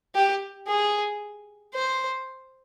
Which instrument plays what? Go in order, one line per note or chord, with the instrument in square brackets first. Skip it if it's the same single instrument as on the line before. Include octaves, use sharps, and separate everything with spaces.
[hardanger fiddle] G4
G#4
C5